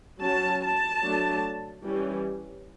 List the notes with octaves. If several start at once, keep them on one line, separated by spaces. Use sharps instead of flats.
F#3 C#4 A5
A5
F#3 A3 D4
E3 G3 C#4